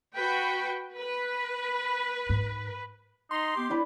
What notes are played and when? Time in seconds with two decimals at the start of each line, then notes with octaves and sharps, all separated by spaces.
0.16 F#4 B4 G5
0.97 B4
2.29 G#2
3.31 D#4 C6
3.56 B3 G4
3.70 D4 E4 B4